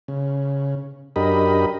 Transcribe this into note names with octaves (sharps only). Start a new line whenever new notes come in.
C#3
F#2 D4 G4 A#4 D#5 B5